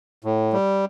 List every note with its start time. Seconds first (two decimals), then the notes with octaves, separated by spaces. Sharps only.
0.24 A2
0.53 G3